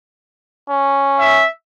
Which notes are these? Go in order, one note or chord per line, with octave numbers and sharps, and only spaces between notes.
C#4
E5